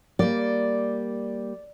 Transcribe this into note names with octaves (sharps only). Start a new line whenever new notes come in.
G3 A#3 D5